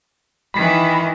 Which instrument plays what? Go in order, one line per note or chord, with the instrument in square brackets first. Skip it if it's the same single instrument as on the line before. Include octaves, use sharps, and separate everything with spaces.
[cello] D#3 E3 [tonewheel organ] B5